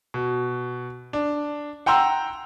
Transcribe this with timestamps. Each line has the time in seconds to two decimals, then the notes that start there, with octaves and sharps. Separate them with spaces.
0.14 B2
1.13 D4
1.86 F#5 G5 A#5 C6 E6